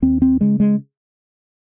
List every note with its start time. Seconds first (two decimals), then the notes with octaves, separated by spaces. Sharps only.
0.02 D#2 C4
0.22 C4
0.40 C#3 G#3
0.60 G#3